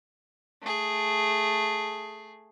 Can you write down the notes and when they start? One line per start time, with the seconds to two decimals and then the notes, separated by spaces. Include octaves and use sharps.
0.62 A3 G#4